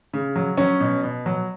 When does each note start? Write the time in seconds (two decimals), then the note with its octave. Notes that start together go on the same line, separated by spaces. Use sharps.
0.14 C#3
0.36 F#3
0.57 F#3 C#4
0.80 B2
1.03 B2
1.26 F#3